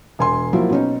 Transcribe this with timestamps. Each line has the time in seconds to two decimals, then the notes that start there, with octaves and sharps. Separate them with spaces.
0.19 E1 G#5 C6
0.53 F3 F#3 A#3 E4
0.70 B2 C#4 D#4